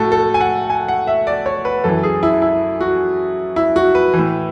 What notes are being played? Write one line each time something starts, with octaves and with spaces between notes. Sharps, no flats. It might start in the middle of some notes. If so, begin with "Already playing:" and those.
Already playing: A2 F#4 A4
A4
G#5
F#5
G#5
F#5
E5
D5
C#5
B4
F#2 E3 A4
G#4
E4
E4
F#4
E4
F#4
B4
A2 E3